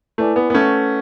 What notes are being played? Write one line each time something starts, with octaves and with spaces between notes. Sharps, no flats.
A3 E4 B4 D5 G#5 D6
B3
B3
A3 C#4 B4 F#5 C#6